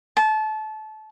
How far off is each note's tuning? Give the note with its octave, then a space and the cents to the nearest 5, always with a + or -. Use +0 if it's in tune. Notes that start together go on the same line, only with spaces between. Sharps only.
A5 -25